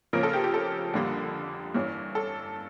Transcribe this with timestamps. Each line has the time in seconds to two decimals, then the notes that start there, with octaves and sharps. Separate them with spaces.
0.13 C#3 F3 A#3 C#4 A#4
0.23 A4
0.33 G4
0.44 G4
0.54 A4
0.94 F2 D3 G3 A#3
1.74 G2 E3 A#3 C#4
2.15 A4